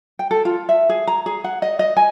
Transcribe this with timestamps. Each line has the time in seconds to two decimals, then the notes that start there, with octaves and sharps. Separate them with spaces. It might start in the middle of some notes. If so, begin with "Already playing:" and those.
0.19 G5
0.31 A4
0.45 F4
0.69 E5
0.89 G#4
1.07 A#5
1.26 G#4
1.44 F#5
1.62 D#5
1.79 D#5
1.97 G#5